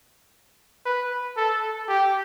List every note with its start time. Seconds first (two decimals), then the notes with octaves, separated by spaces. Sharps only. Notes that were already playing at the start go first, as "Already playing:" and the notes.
0.86 B4
1.37 A4
1.88 G4